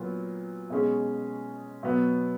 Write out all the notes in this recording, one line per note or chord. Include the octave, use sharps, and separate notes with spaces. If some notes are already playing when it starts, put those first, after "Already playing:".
Already playing: A#2 F#3 B3 F4
B2 G#3 C#4 G#4
B2 F#3 B3